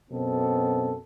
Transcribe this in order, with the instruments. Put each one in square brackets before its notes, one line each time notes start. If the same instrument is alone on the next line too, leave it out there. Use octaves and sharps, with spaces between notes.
[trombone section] F#2 B2 C4 A4